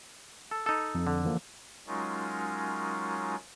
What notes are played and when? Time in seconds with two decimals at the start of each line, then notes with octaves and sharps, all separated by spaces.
0.51 A4
0.66 D#4 A4
0.95 F2
1.07 D3
1.24 E3 F3 A#3
1.87 F#3 G#3 C#4 D#4 F4 A#4